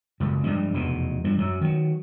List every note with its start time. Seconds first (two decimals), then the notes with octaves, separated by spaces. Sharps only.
0.20 F#1 C#2 F#2
0.44 G2 F3 G3 G#3
0.74 F1 E2 B2
1.24 G2 F3
1.38 F#2 F#3
1.61 D#3 F#3